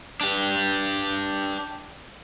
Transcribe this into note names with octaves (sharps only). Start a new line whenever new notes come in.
D4 G4